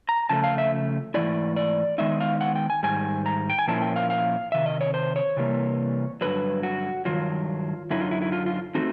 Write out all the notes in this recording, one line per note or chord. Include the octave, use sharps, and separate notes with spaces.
A#5
C#3 F3 A3 A5
F5
E5
G#2 E3 A3 E4 D5
D5
D#3 G#3 B3 D#4 E5
F5
F#5
G5
G#5
G#2 D#3 G3 G#5
A#5
G5
G#5
A#2 F3 A#3 C#4 E4 A5
G5
F5
F5
C3 D#3 E5
D#5
C#5
C5
C#5
C3 E3 G3 A#3
G2 D3 F#3 B4
F#4
G2 D#3 F#3 F4
F#2 D3 F#3 D#4 E4
F4
E4
E4
F4
F4
E3 A3 C4 D#4 F#4